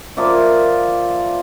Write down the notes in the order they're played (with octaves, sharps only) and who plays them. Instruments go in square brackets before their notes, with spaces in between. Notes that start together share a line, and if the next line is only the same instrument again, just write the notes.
[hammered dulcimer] F3 A#3 D5 E5